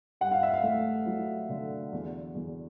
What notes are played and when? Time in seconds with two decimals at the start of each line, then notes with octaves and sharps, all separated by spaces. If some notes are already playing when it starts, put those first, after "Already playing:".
0.21 G2 F#5
0.31 F5
0.43 E5
0.53 F5
0.63 A3
1.06 F#3
1.49 D3
1.93 E2
2.35 E2